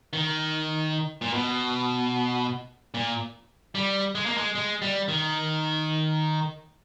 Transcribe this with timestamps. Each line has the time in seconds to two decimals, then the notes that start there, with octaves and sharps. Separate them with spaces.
0.13 D#3
1.21 A#2
1.33 B2
2.94 A#2
3.75 G3
4.15 G#3
4.26 A#3
4.37 G#3
4.55 G#3
4.82 G3
5.08 D#3